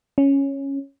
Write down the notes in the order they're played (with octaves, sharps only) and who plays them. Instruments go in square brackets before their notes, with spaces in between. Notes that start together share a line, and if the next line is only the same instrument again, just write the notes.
[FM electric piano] C#4